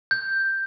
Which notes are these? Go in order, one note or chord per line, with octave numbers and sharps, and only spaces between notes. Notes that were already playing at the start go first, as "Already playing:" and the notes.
G6